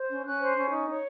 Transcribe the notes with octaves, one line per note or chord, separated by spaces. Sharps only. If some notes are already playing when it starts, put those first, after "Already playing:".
Already playing: C5
C#4
C#4 F#6
C5
C#4
D#4
C#5